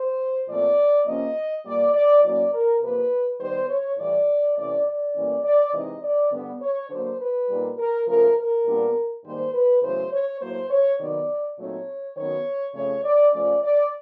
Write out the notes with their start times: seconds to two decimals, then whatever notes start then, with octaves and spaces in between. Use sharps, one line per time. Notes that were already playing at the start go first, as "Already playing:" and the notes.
Already playing: C5
0.48 A#2 F3 A3 C4 D5
1.06 C3 F3 A#3 C#4 D#5
1.64 A#2 G3 A#3 D5
1.93 D5
2.23 A2 F#3 A#3 C#4 D5
2.53 A#4
2.81 C3 F3 A#3 B4
3.40 D#3 G3 B3 C5
3.69 C#5
3.98 A2 E3 G3 D5
4.56 C3 E3 A3 C#4 D5
4.86 D5
5.15 A2 E3 G3 A#3 C#4
5.44 D5
5.73 C3 E3 G#3 C4 D#4 D#5
6.03 D5
6.31 G2 D3 G3 B3
6.61 C#5
6.90 D3 F#3 A#3 C5
7.20 B4
7.49 A#2 G3 A#3 D#4
7.78 A#4
8.07 C#3 F3 A3 A#4
8.37 A#4
8.66 A#2 G3 B3 D4
9.24 G#2 D#3 G3 A#3 C5
9.53 B4
9.82 E2 C#3 F#3 A3 C5
10.12 C#5
10.40 A2 F#3 A#3 C5
10.69 C#5
10.99 C3 D#3 F#3 B3 D#4 D5
11.58 A#2 F#3 A3 C4 D#4 C#5
12.16 F#2 D#3 F#3 B3 C#5
12.74 F2 C#3 F3 A3 C#5
13.03 D5
13.32 C#3 F3 A3 C#4 D5
13.63 D5